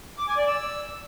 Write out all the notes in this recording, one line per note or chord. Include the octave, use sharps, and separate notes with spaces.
D6
G#5
D5
E6